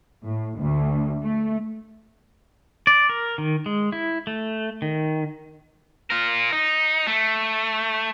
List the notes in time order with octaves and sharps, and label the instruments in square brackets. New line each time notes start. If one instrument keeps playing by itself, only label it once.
[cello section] A2
D2
A3
[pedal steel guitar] D5
A#4
D#3
G#3
E4
A3
D#3
[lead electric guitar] F4 A#4
D#4
A3